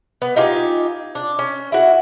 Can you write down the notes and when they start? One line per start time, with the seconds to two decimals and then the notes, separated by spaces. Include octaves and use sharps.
0.22 B3
0.36 D#4 F4 G4 G#5
1.15 D4
1.39 C#4
1.72 E4 F#4